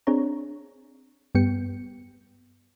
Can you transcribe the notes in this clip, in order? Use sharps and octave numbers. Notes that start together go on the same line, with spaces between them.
C4 D4 G#4 C#5 A#5
G2 G3 B3 G5 C#7